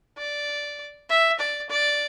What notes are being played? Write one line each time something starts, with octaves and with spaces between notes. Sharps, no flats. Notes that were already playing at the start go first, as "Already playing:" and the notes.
D5
E5
D5
D5